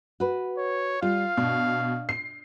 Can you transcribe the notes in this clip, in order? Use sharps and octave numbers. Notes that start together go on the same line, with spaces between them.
F#4 B4
C#5
G3 F4 F5
B2 D4
C7